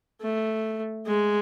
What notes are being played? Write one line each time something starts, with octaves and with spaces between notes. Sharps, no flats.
A3
G#3